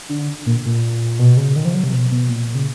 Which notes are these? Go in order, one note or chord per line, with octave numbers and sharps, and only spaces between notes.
D3
A#2
A#2
B2
C#3
D#3
F3
F#3
C3
B2
B2
A#2
C#3